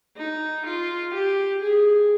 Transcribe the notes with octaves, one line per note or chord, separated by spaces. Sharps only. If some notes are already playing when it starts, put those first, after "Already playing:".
D#4
F4
G4
G#4